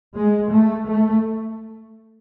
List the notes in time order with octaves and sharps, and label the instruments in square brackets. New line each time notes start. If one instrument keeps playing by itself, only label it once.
[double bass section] G#3
A3
A3